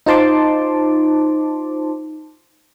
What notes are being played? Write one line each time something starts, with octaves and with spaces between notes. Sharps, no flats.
D#4 F4 C5 A5 C6 D6